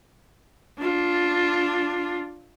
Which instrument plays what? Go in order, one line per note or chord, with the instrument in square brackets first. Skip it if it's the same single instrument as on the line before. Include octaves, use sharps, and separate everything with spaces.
[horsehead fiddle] D4 F4